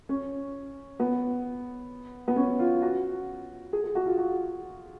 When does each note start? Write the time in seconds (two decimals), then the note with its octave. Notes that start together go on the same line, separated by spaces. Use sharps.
0.09 C#4
1.00 B3
2.28 B3
2.36 C#4
2.59 F4
2.82 F#4
3.73 G#4
3.84 G#4
3.95 F#4
4.06 F4
4.18 F#4